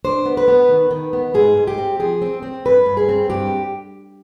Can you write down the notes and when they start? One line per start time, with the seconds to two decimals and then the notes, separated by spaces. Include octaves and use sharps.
0.05 D4 C5
0.25 B3
0.37 B4
0.48 B3
0.69 D#3
0.91 D#3
1.13 B3
1.34 G#2 G#4
1.57 G#2
1.67 G4
1.78 C4
2.00 F3 G#4
2.22 C4
2.43 C4
2.65 G2 B4
2.86 G2
2.97 G#4
3.09 C4
3.30 G2 G4